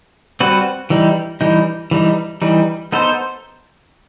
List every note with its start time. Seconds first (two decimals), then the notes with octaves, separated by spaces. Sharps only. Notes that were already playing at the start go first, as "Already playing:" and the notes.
0.40 G3 C4 F#4 B4
0.90 E3 G3 D#4
1.41 E3 G3 D#4
1.91 E3 G3 D#4
2.42 E3 G3 D#4
2.92 B3 D#4 A4 C5